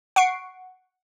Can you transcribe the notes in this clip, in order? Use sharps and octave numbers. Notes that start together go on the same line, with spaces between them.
F#5 C#6 C7 D7